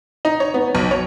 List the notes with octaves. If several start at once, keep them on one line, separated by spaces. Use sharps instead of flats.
D#4
C#5
B3
B1
C#5